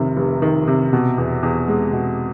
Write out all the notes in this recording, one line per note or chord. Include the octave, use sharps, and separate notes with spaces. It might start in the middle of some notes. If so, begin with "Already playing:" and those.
Already playing: F1 C3 D#3
F1
D#3
C3
B2
E2
E2
G#3
B2